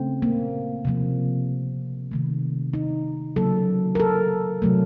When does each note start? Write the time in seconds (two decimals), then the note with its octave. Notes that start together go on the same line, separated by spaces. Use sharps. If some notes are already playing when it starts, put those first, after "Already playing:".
Already playing: C#3 A3 C4
0.22 A#3
0.85 C3 F3 A#3
2.11 C3 D#3 A3
2.74 D#4
3.36 C#3 F#3 A#3 A4
3.95 A#4
4.00 A4
4.62 C3 F#3 A3